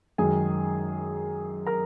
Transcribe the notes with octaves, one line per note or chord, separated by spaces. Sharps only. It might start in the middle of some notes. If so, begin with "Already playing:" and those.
F#2 D#3 G#3 G#4 G#5
A#4 A#5